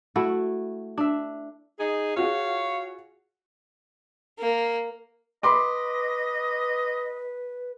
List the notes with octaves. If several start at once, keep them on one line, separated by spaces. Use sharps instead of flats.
A3 E4 F#4
D4 E5
D#4 G#4
F4 F#4 G#4 C#5 F5
A#3
B4 D#5 B5 C6 D6